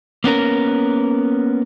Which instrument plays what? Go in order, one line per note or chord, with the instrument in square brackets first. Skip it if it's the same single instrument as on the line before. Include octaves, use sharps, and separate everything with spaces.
[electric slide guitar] A#3 B3 C#4 A#4